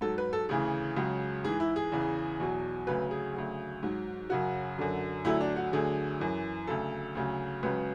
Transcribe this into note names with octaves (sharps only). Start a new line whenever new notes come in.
G#2 F#3 A4
B4
A4
D2 C#3 E3 G#4
C#2 C#3 F#3
G#2 E3 G#4
E4
G#4
E2 C#3 E3
E2 B2 F#3
D2 C#3 F#3 B4
G#4
D2 C#3 F#3
G#2 F#3
F#2 C#3 F#3 F#4
F#2 D3 F#3
D2 D3 F#3 E4
D4
F#4
D2 D3 F#3 G#4
F#2 E3
D2 C#3 F#3 A4
D2 C#3 F#3
C#2 C#3 F#3 B4